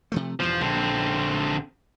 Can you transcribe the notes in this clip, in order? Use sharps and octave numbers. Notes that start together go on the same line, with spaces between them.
C3 F3 A3
E2 G2 B2 F3
A#1 D3 C4